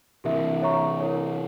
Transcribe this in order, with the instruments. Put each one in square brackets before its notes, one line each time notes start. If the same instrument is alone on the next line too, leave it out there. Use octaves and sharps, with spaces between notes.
[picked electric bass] C3 E3 [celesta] G4 A#4 E5
[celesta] C#5 E5 A#5 C#6
E4 A#4 C#5